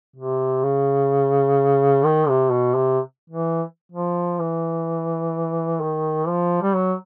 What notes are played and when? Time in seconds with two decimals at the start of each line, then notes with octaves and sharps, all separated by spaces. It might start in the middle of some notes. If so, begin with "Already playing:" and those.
0.16 C3
0.63 C#3
2.04 D#3
2.28 C3
2.51 B2
2.74 C3
3.29 E3
3.92 F3
4.39 E3
5.80 D#3
6.27 F3
6.62 G3
6.75 F#3